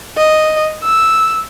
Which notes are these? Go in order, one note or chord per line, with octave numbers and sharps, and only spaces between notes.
D#5
E6